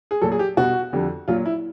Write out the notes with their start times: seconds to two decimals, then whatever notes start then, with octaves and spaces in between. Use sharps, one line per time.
0.11 G#4
0.22 A#2 F#3 A4
0.32 G#4
0.39 G4
0.57 B2 G3 F#4
0.93 F2 D3 G3
1.28 A#2 F#3 F4
1.46 E4